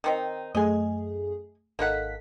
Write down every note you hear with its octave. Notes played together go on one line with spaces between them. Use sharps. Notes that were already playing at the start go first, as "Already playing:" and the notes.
D#3 C4 D#4
F#2 A3 G#4 D#5 G#5
G#1 A#3 D#4 A4 F#5 B6